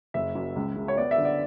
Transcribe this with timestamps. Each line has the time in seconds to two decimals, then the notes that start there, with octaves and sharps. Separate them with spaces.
0.14 F#1 E5
0.35 F#2
0.56 C#2
0.76 C#3
0.88 C#5
0.97 B3 D5
1.11 E5
1.18 D3
1.25 D5